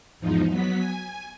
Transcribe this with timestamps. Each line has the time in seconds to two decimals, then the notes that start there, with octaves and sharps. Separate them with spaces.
0.20 E2 G#2 F3 D#4
0.50 F#3 B3 B6
0.79 G#5